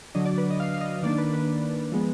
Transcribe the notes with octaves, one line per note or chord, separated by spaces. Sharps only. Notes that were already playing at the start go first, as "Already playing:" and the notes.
D3 F#3 D4 D#5
D5
B4
D#5
F5
F5
D#5
D#3 A#3 D4 D5
B4
B4
F3 G#3 B3